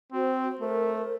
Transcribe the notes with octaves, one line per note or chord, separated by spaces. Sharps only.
C4 F#4 C5
A3 A#4 C5